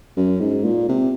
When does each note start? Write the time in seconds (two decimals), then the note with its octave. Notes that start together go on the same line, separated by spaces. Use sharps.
0.17 F#2
0.40 G#2
0.65 A#2
0.89 C3